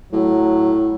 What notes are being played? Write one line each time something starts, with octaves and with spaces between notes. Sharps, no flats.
A2 F#3